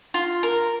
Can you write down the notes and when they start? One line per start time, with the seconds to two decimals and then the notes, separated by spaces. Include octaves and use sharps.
0.14 F4
0.43 A#4